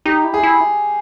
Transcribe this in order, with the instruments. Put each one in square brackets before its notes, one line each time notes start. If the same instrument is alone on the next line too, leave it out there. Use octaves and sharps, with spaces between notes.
[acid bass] D#4 [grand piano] G4
[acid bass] E4
[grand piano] G#4
[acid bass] E4